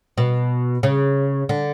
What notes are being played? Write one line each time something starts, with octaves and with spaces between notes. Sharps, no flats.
B2
C#3
D3